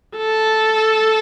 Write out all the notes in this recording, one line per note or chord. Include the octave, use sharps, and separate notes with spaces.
A4